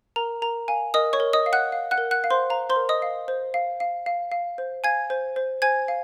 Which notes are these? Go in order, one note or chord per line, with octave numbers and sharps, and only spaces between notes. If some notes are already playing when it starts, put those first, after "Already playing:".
A#4 A#5
A#4 A#5
F5 G#5
A#4 D#5 D#6
C#5 C#6
A#4
D#5 D#6
F5
F#5 F#6
F5
F#5 F#6
A#4
F#5 F#6
F5
C5 C6
F5 A#5
C5 C6
A#4
D#5 D#6
F5
C5
F5
F5
F5
F5
C5
F5 G#5 G#6
C5
C5
C5 G#5 G#6
F5